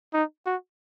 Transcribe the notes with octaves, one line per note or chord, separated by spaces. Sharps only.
D#4
F#4